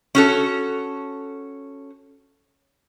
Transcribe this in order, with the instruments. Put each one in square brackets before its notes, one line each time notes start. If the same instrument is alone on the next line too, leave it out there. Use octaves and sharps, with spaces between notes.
[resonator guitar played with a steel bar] C#4 F#4 A4